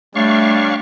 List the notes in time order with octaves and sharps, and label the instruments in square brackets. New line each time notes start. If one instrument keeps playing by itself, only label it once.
[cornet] G3 [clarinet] A3 [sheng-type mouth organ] D4 C#5 D5 [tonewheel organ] F5 C#6